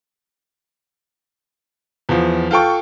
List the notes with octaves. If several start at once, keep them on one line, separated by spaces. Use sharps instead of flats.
E2 F3
F4 A4 G5 C#6